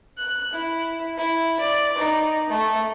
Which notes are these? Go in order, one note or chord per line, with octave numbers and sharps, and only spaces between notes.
F#6
E4
E4
D5
D#4
A3